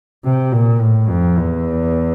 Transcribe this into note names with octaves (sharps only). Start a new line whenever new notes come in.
C3
A#2
A2
F2
E2